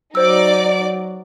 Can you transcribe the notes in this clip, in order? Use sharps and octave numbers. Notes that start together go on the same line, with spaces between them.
F#3 D#4 C5 D5 D6 E6